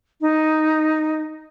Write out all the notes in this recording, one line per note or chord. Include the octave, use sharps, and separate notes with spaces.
D#4